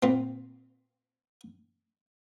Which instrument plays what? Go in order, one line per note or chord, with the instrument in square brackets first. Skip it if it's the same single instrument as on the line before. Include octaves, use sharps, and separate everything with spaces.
[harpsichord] A#2 C4